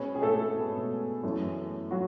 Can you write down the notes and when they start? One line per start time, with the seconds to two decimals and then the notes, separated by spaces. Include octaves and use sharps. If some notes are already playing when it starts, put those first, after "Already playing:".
Already playing: B2 G#3 B3 C#4 C#5
0.15 G#4
0.22 A3 A4
0.57 B2 G#3 B3
1.23 F#2 E3 A3 C#4
1.91 F#3 F#4